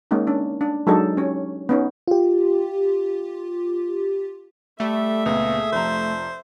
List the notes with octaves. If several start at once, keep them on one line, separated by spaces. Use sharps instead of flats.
G#3 A#3 C#4 D#4
C#4 D4
D4
F#3 G#3 D4 D#4 A4
C#4 G4 C#5
B3 C#4 D#4
F4 G4
G3 A3 E5
C#2 A#2 B3 G#4
F1 F3 C5 A#5